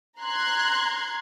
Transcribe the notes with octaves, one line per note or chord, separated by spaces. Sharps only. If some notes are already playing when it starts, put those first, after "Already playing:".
A#5 C6 F#6 G#6